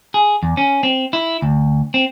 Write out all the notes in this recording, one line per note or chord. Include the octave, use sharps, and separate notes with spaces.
G#4
E2
C#4
C4
E4
D2
C4